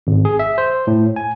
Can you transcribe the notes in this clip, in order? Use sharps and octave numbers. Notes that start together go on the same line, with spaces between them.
G#1
G#4
E5
C5
A2
G#5